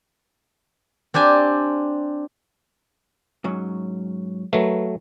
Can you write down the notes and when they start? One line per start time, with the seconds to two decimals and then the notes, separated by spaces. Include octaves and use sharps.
1.14 C4 D4 G4 G#5
3.44 G#2 F#3 C#4
4.53 F#3 A3 A#4 B4 F5